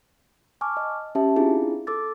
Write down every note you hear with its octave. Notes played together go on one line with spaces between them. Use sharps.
G#5 A5 C#6 D6 F6
D#5
C#4 G4 E5 A5
C4 D4 E4 F4 G#4
A4 D6 E6 A6